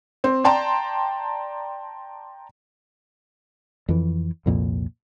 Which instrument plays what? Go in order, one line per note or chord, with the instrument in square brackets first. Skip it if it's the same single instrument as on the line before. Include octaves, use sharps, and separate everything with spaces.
[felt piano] C4
D5 G5 A5 A#5 C6
[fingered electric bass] F2 E3
C2 F2 A#2